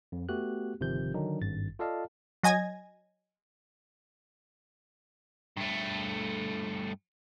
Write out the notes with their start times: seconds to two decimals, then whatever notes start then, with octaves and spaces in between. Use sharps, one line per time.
0.12 F2
0.29 A3 B3 F#4 G4 F#6
0.80 G1 C3 D#3 F3 G6
1.14 D3 D#3 F#3 D4 D#4
1.41 G#1 G2 A6
1.79 F4 A4 D5 D#5 F5 A5
2.43 F#3 D#5 G#5 G#6 A#6
5.57 G2 A3